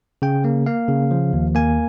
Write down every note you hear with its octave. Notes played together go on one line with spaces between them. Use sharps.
C#3 G5
A#3
A#3 F5
C#3
F3
D#2
A#3 G#5